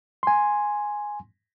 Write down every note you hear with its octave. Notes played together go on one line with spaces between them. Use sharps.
G#5 C6